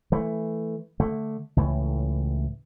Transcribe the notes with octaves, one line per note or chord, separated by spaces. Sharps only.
E3 A3
D3 A3
C#2 A2 E3